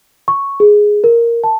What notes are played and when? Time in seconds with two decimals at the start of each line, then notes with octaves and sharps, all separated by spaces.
0.28 C#6
0.60 G#4
1.04 A#4
1.44 A5